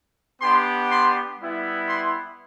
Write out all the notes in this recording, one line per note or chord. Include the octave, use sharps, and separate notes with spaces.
B3 D4 G4 C6
C6
G3 B3 E4
C6